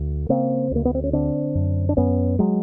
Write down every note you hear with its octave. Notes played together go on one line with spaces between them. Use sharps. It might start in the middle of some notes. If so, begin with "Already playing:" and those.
Already playing: D2
C#3 A#3 C4
D2 A#3
B3
C4
C#4
D3 C4 D4
F#2
D4
F#2 B3 C#4
F#3 G#3